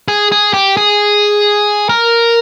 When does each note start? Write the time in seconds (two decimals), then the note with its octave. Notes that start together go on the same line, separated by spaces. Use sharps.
0.08 G#4
0.32 G#4
0.54 G4
0.77 G#4
1.89 A#4